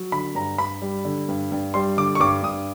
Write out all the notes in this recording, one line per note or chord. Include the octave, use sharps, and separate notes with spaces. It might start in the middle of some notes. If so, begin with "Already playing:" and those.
Already playing: F#3
D3 B5
G2 A#5
G2 B5
G3
D3
G2
G2
G3 C6
D3 D6
C#6
G2 D6
G2 D#6